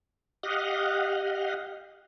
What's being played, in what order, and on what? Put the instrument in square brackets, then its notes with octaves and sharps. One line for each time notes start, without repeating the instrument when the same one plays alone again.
[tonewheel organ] G4 D#5 F5 F#5